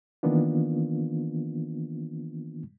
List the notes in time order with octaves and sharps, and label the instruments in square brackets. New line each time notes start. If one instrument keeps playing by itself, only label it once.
[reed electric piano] D#3 E3 A#3 B3 D4 F4